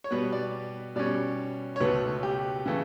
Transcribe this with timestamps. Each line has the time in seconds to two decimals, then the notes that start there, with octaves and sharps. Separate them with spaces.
0.04 C#5
0.11 B2 G3 B3 B4
0.32 D5
0.96 B2 G3 C#4 D5
1.76 C#5
1.80 C#2 B2 A3 B4
2.23 G4
2.66 C#3 E3 A3